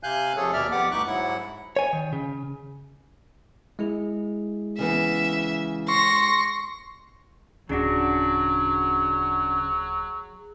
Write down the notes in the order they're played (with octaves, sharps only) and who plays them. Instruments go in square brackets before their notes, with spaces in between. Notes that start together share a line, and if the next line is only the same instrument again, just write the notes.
[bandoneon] C3 F5 G#5 F#6 G6
F2 C3 G#4 A4 C#5
D#2 B2 D5 E5 F6
F2 B3 G4 F#5 D6
D2 G2 D#4 C#6 D6 F#6
G#2 F#3 E4 F#5
[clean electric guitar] C#5 G#5
D#3
C#3
[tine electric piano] G#3 E4 G#4
[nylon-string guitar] C#3 E3 B3 [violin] E5
[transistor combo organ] C6 C#6 [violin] A#6
[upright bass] D1 C#4 [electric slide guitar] C#3 D4 F#4 [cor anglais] F#3 [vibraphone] G#4